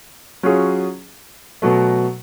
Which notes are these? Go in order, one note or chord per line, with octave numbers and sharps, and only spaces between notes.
F#3 C#4 F4 G#4
B2 F#3 A3